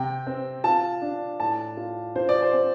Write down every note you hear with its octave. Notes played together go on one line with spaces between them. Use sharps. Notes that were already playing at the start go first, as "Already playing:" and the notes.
Already playing: C3 G5
C4
F4 A5
D4
A2 A5
F4
F4 C5
D5
C5
C4